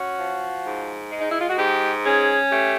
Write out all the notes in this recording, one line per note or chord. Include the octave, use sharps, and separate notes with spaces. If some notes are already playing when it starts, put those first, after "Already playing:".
Already playing: C#4 F#4
F3
G#2
G#3
D#4
E4
F4
F#4
G#2 G4
C#4 G#4
A3 G4